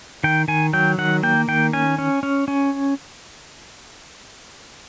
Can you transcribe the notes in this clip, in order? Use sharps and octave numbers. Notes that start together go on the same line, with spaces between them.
D#3 G5
D#3 G#5
F#3 G5
D#3 F#5
A#3 G5
D#3 G5
C#4 G#5
C#4
C#4
C#4